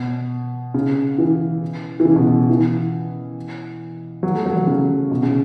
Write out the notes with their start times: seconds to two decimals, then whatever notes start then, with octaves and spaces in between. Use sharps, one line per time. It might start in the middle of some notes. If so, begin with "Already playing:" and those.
Already playing: B2
0.74 C#3
1.18 E3
2.00 E3
2.05 C#3
2.16 B2
2.27 B2
2.50 E3
4.23 F#3
4.34 A3
4.46 F#3
4.57 F#3
4.67 C#3
5.11 B2
5.23 C#3